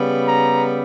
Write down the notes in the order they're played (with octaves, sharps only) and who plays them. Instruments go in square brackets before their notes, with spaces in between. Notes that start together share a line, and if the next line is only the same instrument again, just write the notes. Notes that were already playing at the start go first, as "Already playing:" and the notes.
Already playing: [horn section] C#3 G3 B3
A#5